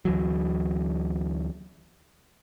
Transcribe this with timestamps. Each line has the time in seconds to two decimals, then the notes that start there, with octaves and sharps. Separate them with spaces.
0.05 D2 E3 F#3